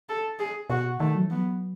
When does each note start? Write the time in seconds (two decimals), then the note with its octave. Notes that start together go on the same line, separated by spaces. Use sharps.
0.09 A4
0.39 G#4
0.70 B2 F#4
1.00 D#3 A3
1.15 F#3
1.26 E3
1.30 B3
1.35 F#3